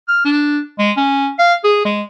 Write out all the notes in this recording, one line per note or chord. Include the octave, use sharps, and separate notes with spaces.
F6
D4
G#3
C#4
F5
G#4
G#3